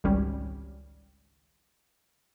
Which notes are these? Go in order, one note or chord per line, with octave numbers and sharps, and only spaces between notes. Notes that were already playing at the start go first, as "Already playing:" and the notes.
G#1 C#2 G3 C#4 G4